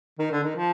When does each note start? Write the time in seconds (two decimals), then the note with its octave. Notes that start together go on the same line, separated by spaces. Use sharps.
0.19 D#3
0.32 D3
0.44 D#3
0.56 F3